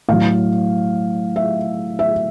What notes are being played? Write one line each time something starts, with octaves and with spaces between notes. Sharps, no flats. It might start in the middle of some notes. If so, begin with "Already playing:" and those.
A2 F#3 F5
E5
E5